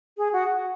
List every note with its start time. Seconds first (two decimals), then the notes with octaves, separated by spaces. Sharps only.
0.17 G#4
0.33 F#4